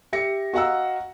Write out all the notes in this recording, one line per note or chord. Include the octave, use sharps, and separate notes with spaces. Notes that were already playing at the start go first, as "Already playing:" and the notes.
G4 E5 A#6 C#7
F#4 D#5 F5 F#5 A#5 E6